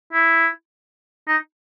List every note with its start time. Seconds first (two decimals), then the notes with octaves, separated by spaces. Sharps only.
0.13 E4
1.28 D#4